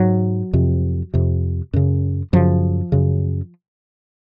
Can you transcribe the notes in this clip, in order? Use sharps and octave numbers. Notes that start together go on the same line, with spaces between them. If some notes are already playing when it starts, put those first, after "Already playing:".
Already playing: G#2 F#3
F2 C3
F2 C3
F#2 C#3
F#2 C#3 F3
F#2 C#3